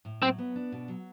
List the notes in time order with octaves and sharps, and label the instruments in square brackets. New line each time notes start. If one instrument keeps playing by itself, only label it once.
[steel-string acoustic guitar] A2
[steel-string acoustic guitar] F#3 [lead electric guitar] C4
[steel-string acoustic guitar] B3
D4
B2
F#3